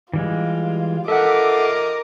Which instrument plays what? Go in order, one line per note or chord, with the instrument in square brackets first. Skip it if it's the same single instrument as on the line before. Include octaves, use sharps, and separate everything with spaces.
[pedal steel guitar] E3 G3 G#3 [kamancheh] F4
[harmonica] F4 A#4 D#5 [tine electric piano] A4 F#5 [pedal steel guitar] E5 [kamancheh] D6